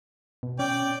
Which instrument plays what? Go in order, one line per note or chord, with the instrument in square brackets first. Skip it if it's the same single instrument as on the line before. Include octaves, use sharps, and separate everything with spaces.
[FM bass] B2
[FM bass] C#4 [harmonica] D5 G5